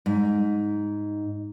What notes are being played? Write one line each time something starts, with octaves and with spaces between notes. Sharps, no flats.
G#2